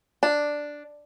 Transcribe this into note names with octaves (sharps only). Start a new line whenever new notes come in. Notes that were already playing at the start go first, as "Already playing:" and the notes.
D4